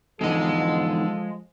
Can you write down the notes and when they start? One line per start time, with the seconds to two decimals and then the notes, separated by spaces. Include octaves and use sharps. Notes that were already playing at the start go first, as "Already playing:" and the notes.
0.21 E2 G#2 D3 F3 G#3 A4 D#5